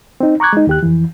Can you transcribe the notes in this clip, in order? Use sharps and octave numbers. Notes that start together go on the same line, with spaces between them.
C4 D#4
A#5 C#6 D6 F#6 G#6
G#3 D#4
D#2 G4 F#6
F2 E3